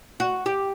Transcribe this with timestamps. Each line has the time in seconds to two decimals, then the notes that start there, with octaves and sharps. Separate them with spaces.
0.20 F#4
0.46 G4